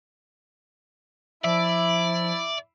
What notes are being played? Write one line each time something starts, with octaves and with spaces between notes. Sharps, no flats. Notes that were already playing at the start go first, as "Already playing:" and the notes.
F3 E4 D5 E5